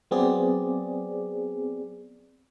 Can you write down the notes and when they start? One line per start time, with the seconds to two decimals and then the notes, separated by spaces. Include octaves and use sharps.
0.11 F#3 B3 C4 G#4 D5